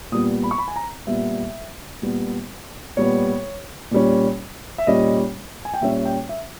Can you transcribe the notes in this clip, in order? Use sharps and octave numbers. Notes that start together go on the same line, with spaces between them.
A#2 G3 B3 D#6
B5
C#6
B5
G#5
A#5
A#2 G3 B3 E5
A#2 G3 B3
A#2 G3 B3 C#5
A#2 G3 C#4
E5
A#2 G3 C#4 D#5
G#5
G5
A#2 G3 C#4 E5
E5
G5
E5